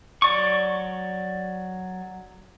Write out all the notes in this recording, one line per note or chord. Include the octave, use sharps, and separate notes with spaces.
F#3 D5 C#6